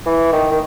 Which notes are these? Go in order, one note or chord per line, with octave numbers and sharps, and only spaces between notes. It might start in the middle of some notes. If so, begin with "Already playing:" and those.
E3
D#3
D#3